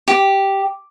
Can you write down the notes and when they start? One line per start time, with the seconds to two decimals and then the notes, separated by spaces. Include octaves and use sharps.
0.08 G4